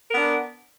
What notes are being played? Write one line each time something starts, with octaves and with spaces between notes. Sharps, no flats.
B3 D4 A#4